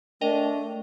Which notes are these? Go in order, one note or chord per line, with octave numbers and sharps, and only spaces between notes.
A3 D4 A#4 D#5 G5